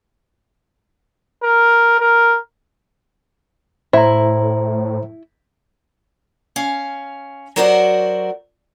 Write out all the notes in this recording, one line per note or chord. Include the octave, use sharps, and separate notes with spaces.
A#4
A#4
A2 E4 C5 A#5
C#4 F5
F#3 F#4 A#4 C5 D5 F#5